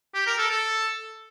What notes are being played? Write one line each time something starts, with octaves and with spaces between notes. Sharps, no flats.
G4
A#4
A4
A4